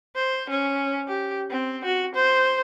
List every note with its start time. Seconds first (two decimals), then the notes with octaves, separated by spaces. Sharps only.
0.15 C5
0.50 C#4
1.07 G4
1.50 C4
1.85 F#4
2.15 C5